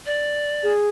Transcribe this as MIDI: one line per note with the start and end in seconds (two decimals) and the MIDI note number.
0.06 0.72 74
0.63 0.89 68